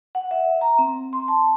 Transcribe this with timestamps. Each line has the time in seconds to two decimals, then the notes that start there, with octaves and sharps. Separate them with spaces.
0.15 F#5
0.31 E5
0.61 A#5
0.78 C4
1.13 C6
1.28 A5